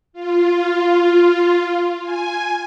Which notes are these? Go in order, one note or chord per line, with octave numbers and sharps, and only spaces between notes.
F4
G#5